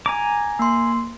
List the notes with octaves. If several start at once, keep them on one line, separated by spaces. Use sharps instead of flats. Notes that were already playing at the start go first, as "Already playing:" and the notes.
G#5 A#5 D6
A#3 C6